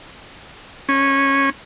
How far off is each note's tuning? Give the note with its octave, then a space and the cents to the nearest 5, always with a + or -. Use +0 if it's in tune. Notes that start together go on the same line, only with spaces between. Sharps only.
C#4 -15